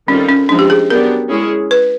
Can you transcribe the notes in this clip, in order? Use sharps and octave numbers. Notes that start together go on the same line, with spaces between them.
D#3 G3 C4 C#4 F4 A4
C#4
F3 G#3 C4 D4 D#4
G4
G#4
F#3 B3 D4 G4 A#4
G#3 C#4 E4 G#4
B4